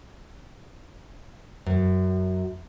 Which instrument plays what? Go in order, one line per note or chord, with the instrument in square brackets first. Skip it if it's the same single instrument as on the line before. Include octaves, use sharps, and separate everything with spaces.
[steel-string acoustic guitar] F#2